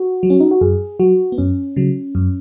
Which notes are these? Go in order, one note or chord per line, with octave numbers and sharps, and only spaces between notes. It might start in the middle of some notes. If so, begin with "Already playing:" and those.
Already playing: F#4
F#3
C#4
D#4
F#4
F#2 G#4
F#3 F#4
B3
F#2 C#4
C#3 F#3
F#2